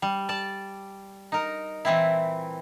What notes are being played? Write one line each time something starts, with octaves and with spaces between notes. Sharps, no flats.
G3
D5 A5
D#4 A#4
A#2 E3 C4 E4